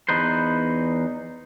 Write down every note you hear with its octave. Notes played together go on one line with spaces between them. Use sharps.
E2 D#4 B4 C5